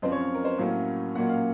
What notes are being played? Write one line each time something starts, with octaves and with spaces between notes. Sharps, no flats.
F#2 F3 C4 C5
C#5
F5
A#4
C5
A2 F#3 A#3 C#4 F5
A#2 F#3 A#3 C#4 F#5
F5